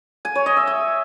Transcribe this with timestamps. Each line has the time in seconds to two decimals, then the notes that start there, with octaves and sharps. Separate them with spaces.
0.25 G#5
0.35 C#5
0.46 D#5
0.57 E5
0.67 G#5